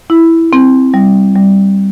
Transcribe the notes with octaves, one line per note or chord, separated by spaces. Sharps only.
E4
C4
G3
G3